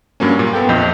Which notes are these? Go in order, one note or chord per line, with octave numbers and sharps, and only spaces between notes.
G2 F#3 A#3 C#4
A#2
B3 A4 G5
A#1 F2 D#5 G6